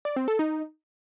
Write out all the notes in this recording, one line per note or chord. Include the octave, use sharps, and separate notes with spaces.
D5
C4
A4
D#4